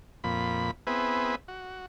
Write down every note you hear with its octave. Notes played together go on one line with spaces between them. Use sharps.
F2 A#2 B5
B3 C4 E4 G#4 B4
F#4